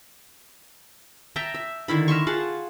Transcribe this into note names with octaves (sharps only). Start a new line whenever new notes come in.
E5 G5 A5 A#5
E5
D3 D#3 E4 B5
A#4 E5 C6 C#6
F4 G#4 F#5 A5